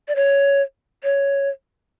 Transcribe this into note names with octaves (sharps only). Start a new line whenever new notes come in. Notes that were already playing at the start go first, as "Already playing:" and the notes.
D5
C#5
C#5